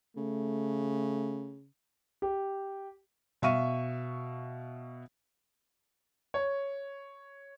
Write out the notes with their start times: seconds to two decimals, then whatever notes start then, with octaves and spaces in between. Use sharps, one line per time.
0.17 C#3 A3
2.22 G4
3.42 B2 E5 F5 C#6 D#7
6.34 C#5